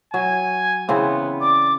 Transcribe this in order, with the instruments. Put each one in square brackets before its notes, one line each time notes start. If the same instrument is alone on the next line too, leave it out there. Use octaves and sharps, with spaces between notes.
[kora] F#3 [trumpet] G#5
[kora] C#3 E3 C4 [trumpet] B3
[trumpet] D5 [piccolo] D6